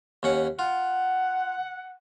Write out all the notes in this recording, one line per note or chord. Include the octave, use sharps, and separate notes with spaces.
D#2 C#4 F#5
F4 F#5